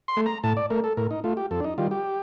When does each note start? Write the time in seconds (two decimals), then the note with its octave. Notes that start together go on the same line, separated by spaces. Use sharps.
0.08 C6
0.17 A3
0.26 A#5
0.44 A2 A5
0.57 D5
0.70 A3 A#4
0.84 A4
0.97 A2 A#4
1.11 D#4
1.24 A3 F4
1.37 G4
1.51 F2 A4
1.60 D4
1.64 D#4
1.78 D#3 G3 F4
1.91 G4